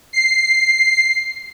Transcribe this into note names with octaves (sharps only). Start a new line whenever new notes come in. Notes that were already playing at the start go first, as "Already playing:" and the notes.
C7